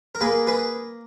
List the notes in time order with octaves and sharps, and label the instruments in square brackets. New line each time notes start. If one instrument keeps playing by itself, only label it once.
[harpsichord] A#4
A#3 G#4 B4
G#4 B4